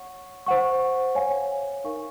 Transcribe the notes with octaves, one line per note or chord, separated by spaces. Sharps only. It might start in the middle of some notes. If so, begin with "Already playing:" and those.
Already playing: C#5 F#5 C#6
C5 F#5 C#6
C#5 F5 G#5
D#4 A#4 F5 G#5 C#6